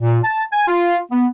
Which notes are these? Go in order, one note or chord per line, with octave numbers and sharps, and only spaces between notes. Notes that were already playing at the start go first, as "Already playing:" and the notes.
A#2
A5
G#5
F4
B3